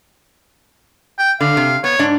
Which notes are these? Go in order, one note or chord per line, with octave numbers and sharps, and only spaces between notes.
G5
D3 F5
C3
B3 C#5
G#2 D4